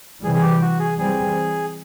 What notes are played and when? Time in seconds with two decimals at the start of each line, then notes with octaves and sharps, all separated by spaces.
0.23 C3 E3 G3 G#4
0.34 G#4
0.42 G4
0.61 F#4
0.79 G#4
0.98 E3 G3 C4 G#4